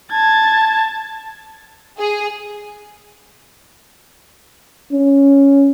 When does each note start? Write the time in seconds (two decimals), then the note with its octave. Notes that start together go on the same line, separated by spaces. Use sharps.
0.11 A5 G#6 A6
1.99 G#4
4.93 C#4